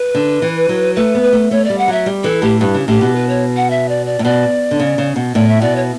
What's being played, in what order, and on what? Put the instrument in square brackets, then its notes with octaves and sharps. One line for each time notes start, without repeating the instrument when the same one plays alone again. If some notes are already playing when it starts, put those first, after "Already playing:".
Already playing: [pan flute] B4
[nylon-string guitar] D3
E3
F#3
[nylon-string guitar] A3 [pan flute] B4
[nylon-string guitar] B3
[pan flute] B4
[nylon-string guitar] A3
[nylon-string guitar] A3 [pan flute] C#5
[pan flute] D5
[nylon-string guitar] G3
[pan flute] F#5
[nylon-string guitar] F#3 [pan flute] E5
[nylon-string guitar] G3
[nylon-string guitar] E3 [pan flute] A4
[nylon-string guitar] A2 [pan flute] G4
[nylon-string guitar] G2 [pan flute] G4
[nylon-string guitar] C#3
[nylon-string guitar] A2 [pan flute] G4
[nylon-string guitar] B2
[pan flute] B4
C#5
F#5
E5
D5
D5
[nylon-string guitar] A2
[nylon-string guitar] B2 [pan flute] D5
[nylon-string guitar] D3
C#3
C#3
B2
[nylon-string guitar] A2 [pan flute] D5
[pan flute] E5
[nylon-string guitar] B2 [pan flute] D5
[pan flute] C#5